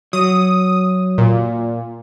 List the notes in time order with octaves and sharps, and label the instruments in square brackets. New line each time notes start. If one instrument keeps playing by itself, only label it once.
[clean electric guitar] F#3 [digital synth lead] D#6
[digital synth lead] A#2